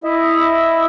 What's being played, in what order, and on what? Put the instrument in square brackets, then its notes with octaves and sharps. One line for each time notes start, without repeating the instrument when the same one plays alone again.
[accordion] E4 D#5 E5